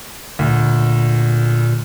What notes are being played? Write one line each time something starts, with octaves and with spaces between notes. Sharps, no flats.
D2 A#2